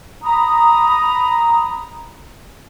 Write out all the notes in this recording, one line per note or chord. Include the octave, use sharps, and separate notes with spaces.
A#5 B5 D#6